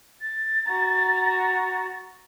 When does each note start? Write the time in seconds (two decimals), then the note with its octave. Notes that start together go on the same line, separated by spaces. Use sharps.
0.22 A6
0.67 F#4 A#5